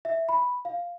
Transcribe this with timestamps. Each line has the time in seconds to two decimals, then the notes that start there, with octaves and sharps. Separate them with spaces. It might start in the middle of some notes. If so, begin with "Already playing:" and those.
0.05 E5
0.29 B5
0.65 F5